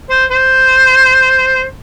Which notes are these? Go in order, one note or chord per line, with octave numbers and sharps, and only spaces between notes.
C5
C5